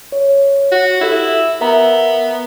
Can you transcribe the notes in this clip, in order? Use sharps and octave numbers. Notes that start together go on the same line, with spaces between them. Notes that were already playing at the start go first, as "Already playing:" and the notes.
C#5
F#4
E4 G4 A4 E5
B3 A#4 E5 A#5